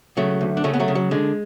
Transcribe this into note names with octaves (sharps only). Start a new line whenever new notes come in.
C#3 F#3 A3
D2
D4
C#3 A3 C#4
B3
F#3 A3
C#3
F#3
D3 G#3